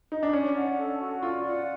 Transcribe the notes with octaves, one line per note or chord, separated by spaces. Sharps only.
D#4
D4
C#4 D5
F#5
A4
F#4
F4 D5
F#5